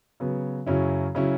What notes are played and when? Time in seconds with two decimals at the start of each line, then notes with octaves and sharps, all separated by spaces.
0.20 C#3 F#3 B3
0.67 F#2 C#3 F#3 C#4 E4
1.15 C#3 F#3 C#4 E4